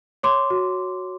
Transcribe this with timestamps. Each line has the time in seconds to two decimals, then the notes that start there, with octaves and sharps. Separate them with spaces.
0.23 C#5 C6 D6
0.50 F#4